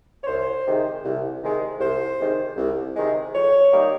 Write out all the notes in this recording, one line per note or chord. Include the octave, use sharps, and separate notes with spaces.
C#5
C2 C5
C3 D#3 G#3
C2
C3 D#3 G#3
C2 C5
C3 D#3 G#3
C2
C3 D#3 G#3
F2 C#5
D#3 G3 A#3